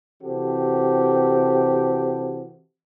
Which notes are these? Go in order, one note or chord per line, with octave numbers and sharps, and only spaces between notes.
C3 E3 C4 F#4 G4 A4